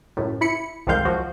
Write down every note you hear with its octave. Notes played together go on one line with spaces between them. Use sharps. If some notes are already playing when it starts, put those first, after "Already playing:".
C#2 F#2 A2
E4 B5 C#7
C2 F2 D#3 G#3 F5 G6
C#2 F3 F#4